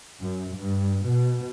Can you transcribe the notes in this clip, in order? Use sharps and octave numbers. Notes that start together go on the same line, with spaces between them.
F#2
G2
B2